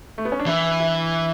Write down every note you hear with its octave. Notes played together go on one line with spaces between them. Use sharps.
A3
B3
C#4
D4
E3 E4
E4